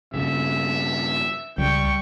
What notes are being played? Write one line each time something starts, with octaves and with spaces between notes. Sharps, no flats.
G2 C#3 E5
C#2 G3 G5 C#6